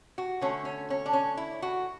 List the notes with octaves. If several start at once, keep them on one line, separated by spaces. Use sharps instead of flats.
F#4
D3 A3 C#4
C#4
C#4
D4
C#4
E4
F#4